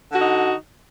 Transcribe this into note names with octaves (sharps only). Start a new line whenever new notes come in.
D3 D#4 F#4